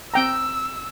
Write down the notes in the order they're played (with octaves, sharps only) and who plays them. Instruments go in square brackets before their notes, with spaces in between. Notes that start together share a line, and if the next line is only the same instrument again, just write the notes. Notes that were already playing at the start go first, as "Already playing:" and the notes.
[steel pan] C4 G5 A#5 [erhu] E6